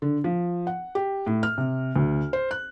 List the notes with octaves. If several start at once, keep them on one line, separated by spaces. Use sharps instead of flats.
D3
F3
F#5
G4
A2
F6
C3
D2
C5
F#6